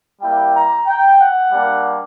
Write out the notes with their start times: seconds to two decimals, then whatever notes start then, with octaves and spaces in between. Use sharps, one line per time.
0.21 G3 A#3 E4 G4 G5
0.54 A#5
0.87 G5
1.20 F#5
1.52 G3 A#3 D4